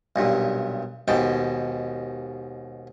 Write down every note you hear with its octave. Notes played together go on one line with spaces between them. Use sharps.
B1 G2 A#2
D#2 G#2 B2 G5 A5